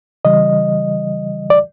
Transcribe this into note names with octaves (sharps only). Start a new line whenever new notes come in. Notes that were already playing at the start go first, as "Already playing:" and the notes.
C#3 E3 G3 D#5
D5